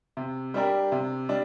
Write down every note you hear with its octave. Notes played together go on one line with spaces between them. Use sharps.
C3
G3 D4 G4 A#4
C3
G3 D4